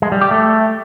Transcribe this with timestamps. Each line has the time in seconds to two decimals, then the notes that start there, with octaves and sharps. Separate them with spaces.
0.02 G#3
0.12 G3
0.21 G4
0.31 A3